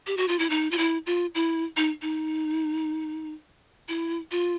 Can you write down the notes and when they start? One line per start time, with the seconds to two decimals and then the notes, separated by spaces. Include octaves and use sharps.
0.07 G4
0.17 F#4
0.28 F4
0.39 E4
0.50 D#4
0.71 F4
0.78 E4
1.07 F4
1.35 E4
1.77 D#4
2.02 D#4
3.89 E4
4.31 F4